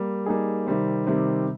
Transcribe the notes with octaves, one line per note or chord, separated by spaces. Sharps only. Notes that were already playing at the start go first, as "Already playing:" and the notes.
Already playing: G3 A#3
G3 A#3 D#4 G#4
C3 D#3 G3 C4
C3 D#3 G3 C4